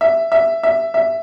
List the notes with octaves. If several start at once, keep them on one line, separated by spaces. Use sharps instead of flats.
E5
E5
E5
E5